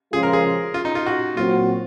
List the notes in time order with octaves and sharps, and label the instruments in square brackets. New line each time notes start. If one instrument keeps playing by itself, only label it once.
[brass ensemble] C#3 F3 G#3 C#4 F4 [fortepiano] G#4
[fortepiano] A#4
G#4
F4
D#4
F4
F#4
[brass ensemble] A#2 F#3 C4 F#4 [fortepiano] F4